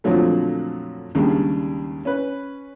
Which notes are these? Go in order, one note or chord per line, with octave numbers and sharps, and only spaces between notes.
F2 A#2 D3 F3 F#3 A3
D#2 C#3 G3 G#3 D4
C#4 B4